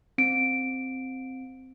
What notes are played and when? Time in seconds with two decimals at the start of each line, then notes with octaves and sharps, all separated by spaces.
0.18 C4 D7